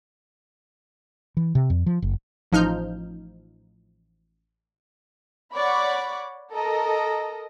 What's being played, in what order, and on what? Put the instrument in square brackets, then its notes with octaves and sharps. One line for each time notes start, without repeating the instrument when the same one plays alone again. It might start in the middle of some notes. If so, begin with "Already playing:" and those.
[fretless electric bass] E3
C3
F2
F3
F#1
[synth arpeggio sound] A1 F3 D#4 F6 G6
[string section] C#5 D5 F#5 B5 C#6 D6
A4 A#4 D#5